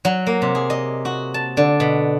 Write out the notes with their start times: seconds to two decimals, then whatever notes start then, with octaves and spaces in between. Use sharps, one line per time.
0.05 F#3
0.27 A#3
0.42 C3
0.55 G#4
0.70 D#5
1.05 F#4
1.34 A5
1.57 D3
1.80 B2